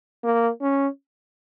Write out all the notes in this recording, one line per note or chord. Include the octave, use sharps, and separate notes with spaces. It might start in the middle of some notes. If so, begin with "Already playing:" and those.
A#3
C#4